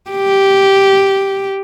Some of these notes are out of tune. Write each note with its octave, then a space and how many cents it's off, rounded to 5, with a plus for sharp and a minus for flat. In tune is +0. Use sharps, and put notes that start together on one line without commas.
G4 -5